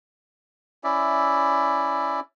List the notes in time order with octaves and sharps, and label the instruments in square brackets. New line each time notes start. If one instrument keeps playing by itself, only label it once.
[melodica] C#4 E4 D5 E5